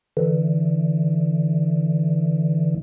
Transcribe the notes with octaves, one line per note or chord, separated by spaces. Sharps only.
D3 E3